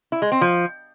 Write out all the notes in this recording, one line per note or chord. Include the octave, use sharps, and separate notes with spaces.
E4
G#3
C4
F3